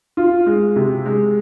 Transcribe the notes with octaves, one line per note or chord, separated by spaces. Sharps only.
F4
G#3
C3
G#3